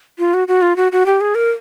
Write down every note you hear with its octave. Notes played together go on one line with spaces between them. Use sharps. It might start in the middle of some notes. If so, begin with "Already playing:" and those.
F4
F#4
F#4
F4
F#4
F#4
G4
G#4
A#4